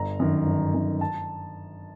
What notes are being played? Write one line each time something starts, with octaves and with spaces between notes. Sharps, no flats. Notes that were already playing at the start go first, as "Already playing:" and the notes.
Already playing: G1 A#5
F#2 D#3
G1
F#2 D#3
A5